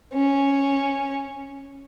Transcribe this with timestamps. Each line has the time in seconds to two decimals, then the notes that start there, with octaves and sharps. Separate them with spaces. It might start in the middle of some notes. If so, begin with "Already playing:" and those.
0.13 C#4